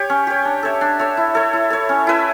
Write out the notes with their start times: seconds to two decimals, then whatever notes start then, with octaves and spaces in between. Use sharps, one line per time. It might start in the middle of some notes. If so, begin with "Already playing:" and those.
Already playing: G4 C#5
0.10 C#4
0.27 G4 C#5
0.45 D4
0.63 A4 C#5 E5
0.81 D4
0.99 A4 C#5 E5
1.17 E4
1.35 A4 C#5
1.53 E4
1.70 A4 C#5
1.89 C#4
2.07 E4 B4 E5